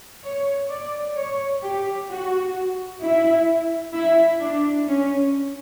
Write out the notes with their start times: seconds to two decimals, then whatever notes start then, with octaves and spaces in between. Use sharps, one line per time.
0.24 C#5
0.70 D5
1.16 C#5
1.62 G4
2.09 F#4
3.01 E4
3.94 E4
4.41 D4
4.88 C#4